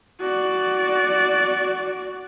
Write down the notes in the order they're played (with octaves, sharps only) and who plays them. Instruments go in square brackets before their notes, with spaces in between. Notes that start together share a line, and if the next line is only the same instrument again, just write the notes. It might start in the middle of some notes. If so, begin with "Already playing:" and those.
[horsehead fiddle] F#4 D5